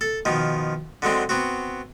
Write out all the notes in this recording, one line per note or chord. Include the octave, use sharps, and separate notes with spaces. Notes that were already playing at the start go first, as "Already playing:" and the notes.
A4
B2 D#3 F3
D3 F#3 G#3 C4
B3 C4 F#4